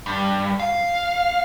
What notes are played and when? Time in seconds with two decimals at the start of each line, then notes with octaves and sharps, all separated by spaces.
0.06 G2
0.59 F5